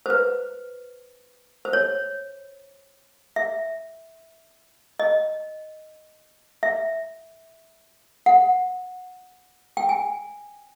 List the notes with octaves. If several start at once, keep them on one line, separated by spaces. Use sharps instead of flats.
C5
B4
C5
C#5
E5
D#5
E5
F#5
G5
G#5